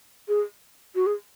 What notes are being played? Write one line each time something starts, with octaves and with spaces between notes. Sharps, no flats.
G#4
F#4
G#4